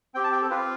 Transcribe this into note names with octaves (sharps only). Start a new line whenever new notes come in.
C4 G4 G5
A5
G5
A4
C4 F4 B4